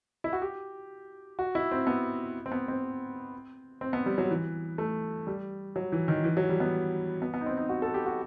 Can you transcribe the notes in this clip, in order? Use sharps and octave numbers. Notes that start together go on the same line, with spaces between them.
E4
F#4
G4
F#4
E4
C4
B3
C4
B3
C4
C4
B3
G3
F#3
E3
A3
G3
F#3
E3
D#3
E3
F#3
G3
B3
B3
B3
D#4
C4
D#4
F#4
A4
G4
F#4